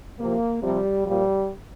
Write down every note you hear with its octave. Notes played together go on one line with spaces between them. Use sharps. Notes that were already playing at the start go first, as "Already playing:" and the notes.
C3 F3 A#3
C3 F3 G3
A#2 F3 G3